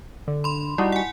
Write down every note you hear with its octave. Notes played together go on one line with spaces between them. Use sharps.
D3
B5 C6
G3 D#4 E4 F#4
F#5 G#5